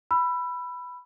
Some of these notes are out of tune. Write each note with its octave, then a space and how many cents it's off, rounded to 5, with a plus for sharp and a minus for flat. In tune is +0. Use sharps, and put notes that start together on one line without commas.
B5 +0 E6 +30